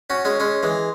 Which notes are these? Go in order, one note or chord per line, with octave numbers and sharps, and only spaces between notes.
C#4 F#4
G#3 C#4
G#3 C#4
E3 G#3